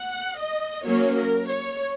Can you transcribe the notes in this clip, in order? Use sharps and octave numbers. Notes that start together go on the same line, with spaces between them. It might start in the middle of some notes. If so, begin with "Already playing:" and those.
Already playing: F#5
D#5
F#3 A#3 C#4 C#5
A#4
C#5